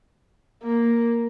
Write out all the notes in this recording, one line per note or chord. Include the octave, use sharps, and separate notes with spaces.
A#3